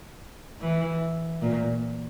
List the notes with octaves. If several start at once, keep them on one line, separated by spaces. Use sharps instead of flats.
E3
A#2